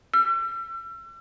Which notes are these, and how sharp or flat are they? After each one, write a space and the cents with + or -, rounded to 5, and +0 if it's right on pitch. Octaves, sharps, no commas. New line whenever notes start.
E6 +40